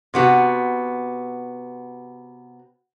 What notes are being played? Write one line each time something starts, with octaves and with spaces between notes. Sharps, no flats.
C3 B3 F#4